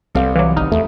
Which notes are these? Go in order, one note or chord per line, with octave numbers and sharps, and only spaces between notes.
C2 G3 B3 C4 A4 F5
E3 F#3 F5 D6
G#1 D#4 D#6 F6
E2 A3